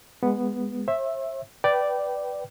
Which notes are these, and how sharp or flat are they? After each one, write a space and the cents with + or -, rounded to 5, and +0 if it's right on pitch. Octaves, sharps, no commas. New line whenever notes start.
G#3 -15 B3 +0
C5 +45 E5 +0
B4 +0 D5 +0 G5 -20